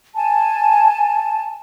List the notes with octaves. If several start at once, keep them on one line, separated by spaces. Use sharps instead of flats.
G#5 A5